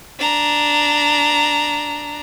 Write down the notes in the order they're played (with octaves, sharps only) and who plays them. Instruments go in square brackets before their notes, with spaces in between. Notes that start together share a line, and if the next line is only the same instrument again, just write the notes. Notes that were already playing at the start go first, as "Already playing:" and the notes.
[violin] D4 A#5